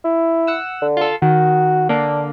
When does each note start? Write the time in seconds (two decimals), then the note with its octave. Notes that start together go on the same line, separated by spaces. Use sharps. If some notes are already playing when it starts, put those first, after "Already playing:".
0.05 E4
0.47 F#5 E6
0.82 D3
0.97 F4 A4
1.22 D#3 F#4
1.89 D3 A#3 D4